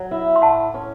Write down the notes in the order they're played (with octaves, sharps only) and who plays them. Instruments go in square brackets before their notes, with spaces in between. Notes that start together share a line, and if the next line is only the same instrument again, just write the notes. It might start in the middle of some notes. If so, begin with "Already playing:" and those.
Already playing: [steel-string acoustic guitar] F#3
E4
[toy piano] C6
[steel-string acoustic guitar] A2 [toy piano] F#5 A5
[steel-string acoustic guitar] C#4